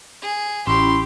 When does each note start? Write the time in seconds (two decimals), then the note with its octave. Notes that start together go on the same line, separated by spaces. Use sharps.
0.22 G#4
0.67 A1 C#4 E4 G4 B5 C6